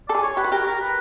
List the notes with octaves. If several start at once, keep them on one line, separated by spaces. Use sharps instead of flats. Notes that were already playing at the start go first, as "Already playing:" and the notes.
A4 D5
G#4
C#5
G4 B4
F#4
G4 A#4
A#4
B4